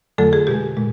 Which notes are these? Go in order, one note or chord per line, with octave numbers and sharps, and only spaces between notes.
F2 D3 F#3 A3 A4
G#4
B2 G#3 G4
A#2 G#3